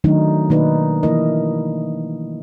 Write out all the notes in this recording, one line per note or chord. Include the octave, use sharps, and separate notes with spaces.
D#3 F#3 A3 D4 D#4
B2 D#3 A#3 D#4 B4 D5
E3 A#3 E4 A#4 D#5